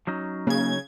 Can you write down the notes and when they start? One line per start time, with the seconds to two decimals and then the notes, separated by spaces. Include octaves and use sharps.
0.07 F#3 C#4 D#4
0.47 C#3 A#3 G#6